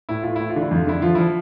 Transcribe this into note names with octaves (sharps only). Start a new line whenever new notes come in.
A2 E4
A2 F4
A2 E4
F4
D3
E4
F2 F4
D3 E4
F3 F4
F3 E4